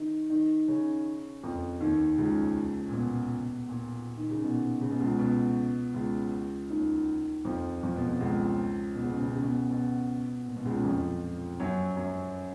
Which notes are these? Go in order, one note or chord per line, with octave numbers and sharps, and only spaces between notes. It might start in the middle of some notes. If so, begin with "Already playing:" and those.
Already playing: D#3 D#4
D#3 D#4
C#3 C#4
F2 F3
D#2 D#3
C#2 C#3
A#2
B2
A#2
D#3
C#3
B2
C#3
B2
C#2 C#3
B2
C#2 C#3
D#2 D#3
F2 F3
F2 F3
B2
B2
C#2 C#3
B2
C#3
B2
C#3
B2
C#3
B2
B2
A#2
B2
C#2 C#3
F#3
F2 F3
F#2 F#3
F#2 F#3